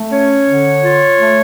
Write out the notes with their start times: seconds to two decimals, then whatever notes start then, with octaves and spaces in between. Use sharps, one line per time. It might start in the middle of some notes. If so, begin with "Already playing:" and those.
Already playing: A3
0.11 C#4 C#5
0.47 D3
0.83 F4
1.19 A3